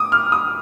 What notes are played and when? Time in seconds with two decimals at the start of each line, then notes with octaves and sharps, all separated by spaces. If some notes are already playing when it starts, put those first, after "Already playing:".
Already playing: D6 D#6
0.12 F6
0.32 D#6